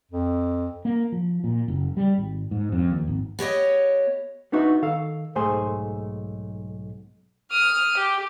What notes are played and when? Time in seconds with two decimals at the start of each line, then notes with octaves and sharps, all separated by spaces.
0.12 F2
0.85 A#3
1.12 F3
1.44 A#2
1.68 F#1
1.97 G3
2.18 G#1
2.51 G#2
2.72 F2
2.91 D#2
3.08 G#1
3.39 B3 G4 C#5 D#5
4.52 B3 D4 D#4 F#4 B4 E5
4.82 D#3 A4 F5
5.35 B1 G#2 A3 G#4 C5 G#5
7.51 D#6 F6
7.97 G4